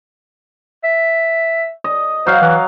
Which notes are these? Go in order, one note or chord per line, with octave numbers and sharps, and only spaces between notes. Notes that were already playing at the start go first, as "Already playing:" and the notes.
E5
D#5
F#3 C5 F5
E3